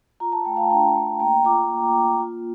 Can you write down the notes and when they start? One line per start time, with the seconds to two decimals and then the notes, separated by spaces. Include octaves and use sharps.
0.20 F4 A#5
0.32 A5
0.45 A3 G5
0.56 F5 A5
0.70 D4 G5 A#5
0.95 A3
1.20 A#3 G5 A#5
1.45 F4 A#5 D6
1.70 A#3
1.95 A#3
2.20 F4